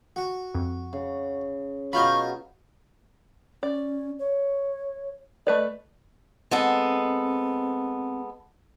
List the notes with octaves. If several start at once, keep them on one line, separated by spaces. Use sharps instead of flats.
F#4
F2
C#3
B2 F#3 F4 D#5 B5 C#6 F6 G6
C#4 D5
C#5
A3 B4 D5 D#5
G#3 B3 C4 A4